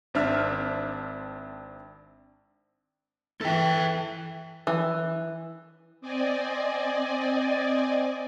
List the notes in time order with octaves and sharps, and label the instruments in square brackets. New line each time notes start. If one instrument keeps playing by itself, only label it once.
[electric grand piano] G#1 C4 D4 E5 F6
[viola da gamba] E3 [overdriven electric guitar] A4 G5
[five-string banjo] E3
[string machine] C4 D5 D#5 G#5